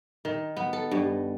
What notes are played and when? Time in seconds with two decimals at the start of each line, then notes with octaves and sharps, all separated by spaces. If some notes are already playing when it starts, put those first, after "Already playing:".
0.25 D#3
0.57 B3
0.73 A4
0.91 G2